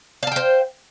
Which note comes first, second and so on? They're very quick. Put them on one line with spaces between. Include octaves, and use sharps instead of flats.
F5 A5 G5 C5